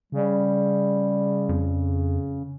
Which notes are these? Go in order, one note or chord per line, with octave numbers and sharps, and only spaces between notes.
C#3 G3
F2